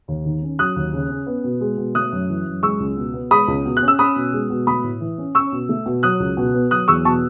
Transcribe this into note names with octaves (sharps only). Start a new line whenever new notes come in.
D#2
D#3
C#4
F#3 D#6 F#6
D#2
C#3
C#4
B3
B2
G#3
B2
A3 D#6 F#6
F#2
E3
F#2
G#3 C#6 E6
C#2
B2
B3
G#3 B5 D#6
C#2
B2
F#6
C#4
E6
C#4 B5 D#6
B2
G#3
B2
A3 B5 D#6
A2
E3
C#4
C#4 C#6 E6
B2
A3
B2
F#3 D#6 F#6
C#2
B2
B3
F#3 D#6 F#6
E2 C#6 E6
B2 A5 C#6